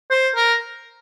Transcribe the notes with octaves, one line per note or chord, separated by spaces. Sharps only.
C5
A#4